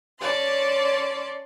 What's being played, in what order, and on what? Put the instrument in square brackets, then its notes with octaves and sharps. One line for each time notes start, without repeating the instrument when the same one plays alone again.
[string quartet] C#4 C#5 D5 A5 C6